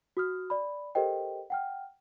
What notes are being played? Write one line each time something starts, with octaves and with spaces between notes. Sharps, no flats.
F#4 D#6 F6
D5 B5
G4 A4 A#4 C5 D#5 G5
F#5 G5 F6